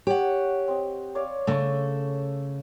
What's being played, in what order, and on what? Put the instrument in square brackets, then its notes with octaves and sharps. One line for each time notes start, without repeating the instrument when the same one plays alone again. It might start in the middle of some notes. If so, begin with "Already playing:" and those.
[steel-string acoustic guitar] G4 F#5 [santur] C#5
[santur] C4 D#5
C#5 D5 F5
[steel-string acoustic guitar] C#3 A3 [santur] C#6 E6